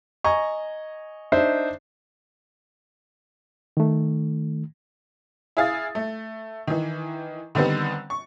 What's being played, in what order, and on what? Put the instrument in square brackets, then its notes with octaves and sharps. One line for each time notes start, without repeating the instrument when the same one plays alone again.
[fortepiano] D#5 G#5 A#5 C#6
D4 D#4 C5 E5
[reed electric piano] D#3 A3
[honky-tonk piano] E4 G#4 F5 D#6 A6
A3
D#3 E3
D3 D#3 G3 B3 C4
C#6